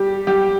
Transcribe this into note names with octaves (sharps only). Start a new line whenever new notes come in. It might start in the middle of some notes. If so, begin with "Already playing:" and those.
Already playing: G3 G4
G3 G4